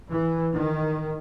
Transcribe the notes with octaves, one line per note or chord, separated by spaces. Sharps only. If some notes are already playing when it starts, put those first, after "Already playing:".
E3
D#3